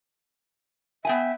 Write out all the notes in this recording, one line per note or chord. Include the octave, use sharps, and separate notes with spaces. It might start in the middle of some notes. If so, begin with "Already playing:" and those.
B3 E5 G5 G#5